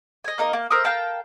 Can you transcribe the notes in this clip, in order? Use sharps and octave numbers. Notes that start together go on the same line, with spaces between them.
D#5 G#5
A#3 D#4 A#4 D#5
A#3
A#4 C5 E5 D#6
A#4 F5 G5 A5